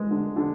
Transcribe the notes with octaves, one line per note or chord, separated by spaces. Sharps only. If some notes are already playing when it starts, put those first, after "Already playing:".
Already playing: G#3
D3
D3